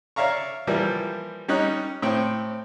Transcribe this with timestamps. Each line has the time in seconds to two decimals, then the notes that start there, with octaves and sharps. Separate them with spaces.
0.16 C#5 D5 E5 F5 A#5 C#6
0.67 E3 F3 G3 A#3 D5
1.48 G3 C#4 D#4 C#5 F#6
2.02 A2 C4 C#5 G5